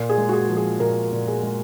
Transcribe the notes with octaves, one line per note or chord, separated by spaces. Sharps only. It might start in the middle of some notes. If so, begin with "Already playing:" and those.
Already playing: A#2
G#4
G#3
F#4
G#4
F3
G#4
A#2 A#4
A#2
G#4
G#3